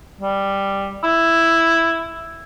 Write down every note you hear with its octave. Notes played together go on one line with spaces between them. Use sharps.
G3
E4